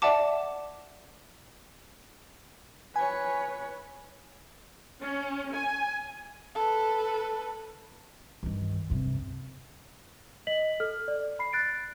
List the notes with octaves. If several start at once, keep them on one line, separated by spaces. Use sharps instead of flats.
D5 E5 F#5 A5 D6
B4 C#5 G#5
C#4
G#5
A4 B4
G2 D#3
G2 C3
D#5 B6 F#7
A4 F6
D5
B5 C7
F#6 A6 D7